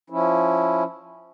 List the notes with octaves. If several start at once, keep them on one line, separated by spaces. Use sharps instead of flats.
F3 C#4 E4